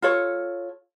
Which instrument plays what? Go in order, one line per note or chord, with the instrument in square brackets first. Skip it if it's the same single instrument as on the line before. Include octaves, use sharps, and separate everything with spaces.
[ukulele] F4 A4 C#5